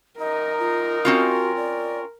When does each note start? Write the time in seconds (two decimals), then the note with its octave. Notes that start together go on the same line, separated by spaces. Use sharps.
0.19 F#2 D#4 A#4 D#5
0.59 F4
1.05 C4 C#4 F4 F#4
1.57 D5